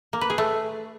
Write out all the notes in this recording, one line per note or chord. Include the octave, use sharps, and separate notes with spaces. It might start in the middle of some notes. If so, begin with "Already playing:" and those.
A#3
B4
G#4
A3